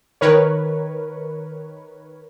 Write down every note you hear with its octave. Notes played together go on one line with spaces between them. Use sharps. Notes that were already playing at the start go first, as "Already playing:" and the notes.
D#3 A#4 B4 C#5